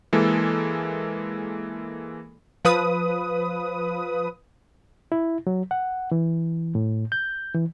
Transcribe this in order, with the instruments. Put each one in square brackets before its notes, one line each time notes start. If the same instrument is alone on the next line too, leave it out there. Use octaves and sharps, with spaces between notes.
[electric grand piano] E3 G#3 A#3 A4
[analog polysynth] F3 B4 D#6
[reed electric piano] E4
F#3
F#5
E3
A2
G6
E3